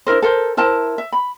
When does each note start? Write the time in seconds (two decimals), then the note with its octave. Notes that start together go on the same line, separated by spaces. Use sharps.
0.07 D4 E4 A#4 C5
0.22 A4 A#4 C5
0.57 E4 A#4 C5 A5
0.98 E5
1.12 B5